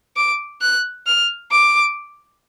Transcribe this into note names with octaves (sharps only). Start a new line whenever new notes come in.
D6
F#6
F6
D6